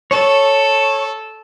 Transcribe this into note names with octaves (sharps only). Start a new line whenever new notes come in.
A4 C#5